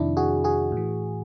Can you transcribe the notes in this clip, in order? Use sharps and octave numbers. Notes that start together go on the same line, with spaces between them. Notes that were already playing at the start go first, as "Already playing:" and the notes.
Already playing: F2 C3 D#3 D4 E4
F#4 G#4
F#4 G#4
A2 E3